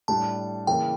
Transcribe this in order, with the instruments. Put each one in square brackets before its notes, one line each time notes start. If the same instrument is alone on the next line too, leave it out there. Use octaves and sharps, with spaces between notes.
[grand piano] A2 G3 D4 [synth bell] A5
[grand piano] C#3 E3 A#3 E4 A#4 [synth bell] G5